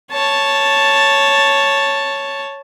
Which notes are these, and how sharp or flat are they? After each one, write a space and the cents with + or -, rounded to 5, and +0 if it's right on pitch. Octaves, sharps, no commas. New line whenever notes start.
C#5 +0 A5 +0